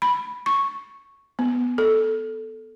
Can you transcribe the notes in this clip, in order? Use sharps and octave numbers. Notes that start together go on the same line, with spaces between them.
B5
C#6
B3
A4